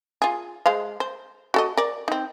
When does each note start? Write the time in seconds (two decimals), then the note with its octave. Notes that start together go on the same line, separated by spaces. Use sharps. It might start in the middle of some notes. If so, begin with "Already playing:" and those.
0.22 F4 G#4
0.66 G#3 C5 F5
1.00 C5
1.54 F#4 A4 D#5
1.77 A#4 D5
2.08 C4 D#4